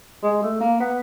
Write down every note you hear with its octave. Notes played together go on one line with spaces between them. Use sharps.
G#3
A3
A#3
B3